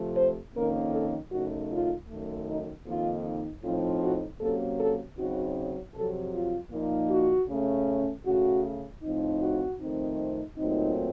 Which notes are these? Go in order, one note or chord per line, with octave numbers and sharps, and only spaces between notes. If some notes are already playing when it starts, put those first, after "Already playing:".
Already playing: C3 F3 A3
C5
F2 D#3 A#3 C#4 A#4
A4
F#2 C#3 A3 D#4 F#4
F4
F#2 D#3 A3
D#4
F2 D#3 A#3 D#4 F4
A2 F3 C4 D#4 F4
F#4
C3 F#3 A#3 C#4 A4
A4
C#3 F#3 C4 D#4 F#4
F2 C3 F#3 A4
F4
A#2 F3 A#3 D#4
F#4
C#3 A3 C#4
C#3 A3 C#4 F#4
A2 F3 C4 D#4
F#4
F2 D#3 A3 C4 D#4
A#2 F#3 A3 C4 D#4